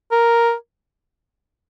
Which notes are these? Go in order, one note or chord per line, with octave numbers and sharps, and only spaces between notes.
A#4